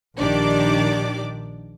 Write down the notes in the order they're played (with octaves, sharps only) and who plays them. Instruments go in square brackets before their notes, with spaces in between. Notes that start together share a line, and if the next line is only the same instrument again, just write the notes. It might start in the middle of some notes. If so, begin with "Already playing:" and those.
[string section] A#1 D#3 D4 G4 D5 D6